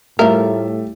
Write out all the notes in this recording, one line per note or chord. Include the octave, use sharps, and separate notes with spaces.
A2 F3 G3 A3 A#4 E5